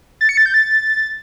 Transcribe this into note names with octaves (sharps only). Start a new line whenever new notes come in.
A6
C#7
A6
G6
A6